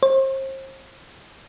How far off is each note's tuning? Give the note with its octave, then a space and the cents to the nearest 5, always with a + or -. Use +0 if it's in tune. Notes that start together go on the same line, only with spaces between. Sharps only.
C5 +35